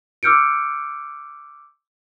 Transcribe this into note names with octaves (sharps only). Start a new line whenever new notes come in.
D6 E6 F6 G6 C#7 D7